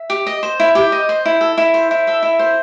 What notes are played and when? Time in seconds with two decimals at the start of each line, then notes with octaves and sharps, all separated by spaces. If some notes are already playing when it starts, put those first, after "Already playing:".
Already playing: E5
0.10 G4
0.26 D#5
0.43 C5
0.60 E4
0.75 G4
0.92 D#5
1.09 C5
1.26 E4
1.41 A4
1.58 E4
1.74 C5
1.91 E4
2.07 A4 E5
2.23 E4
2.39 C5